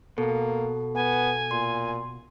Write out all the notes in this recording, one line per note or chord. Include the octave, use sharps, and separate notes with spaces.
B2 A#3 A4
B3 G#5
A#2 C6